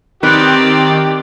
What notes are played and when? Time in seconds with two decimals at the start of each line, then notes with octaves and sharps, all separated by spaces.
0.23 D#3 C4 G4 B4 D5 F#5